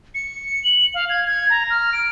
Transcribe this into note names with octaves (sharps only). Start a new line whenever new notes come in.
C#7
F#7
F5
G#6
G#6
A#5
F6
D7